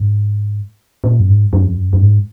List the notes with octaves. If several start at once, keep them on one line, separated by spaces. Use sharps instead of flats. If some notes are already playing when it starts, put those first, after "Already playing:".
Already playing: G#2
A#2
F#2
G#2
F#2
F2
F#2
F#2
G#2